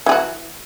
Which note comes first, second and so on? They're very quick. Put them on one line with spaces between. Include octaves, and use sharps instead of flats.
E3 G#4 F#4